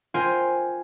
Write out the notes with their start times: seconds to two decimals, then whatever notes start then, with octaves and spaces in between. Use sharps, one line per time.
0.14 F4 A#4 C5 G5 G#5